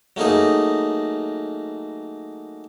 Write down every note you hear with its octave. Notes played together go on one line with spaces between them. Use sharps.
F#3 A3 A#3 D#4 G#4